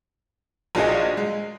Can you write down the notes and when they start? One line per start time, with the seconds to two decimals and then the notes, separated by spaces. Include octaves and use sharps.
0.75 A#1 D4 F4 F#4 G#4 D#5
1.17 G#3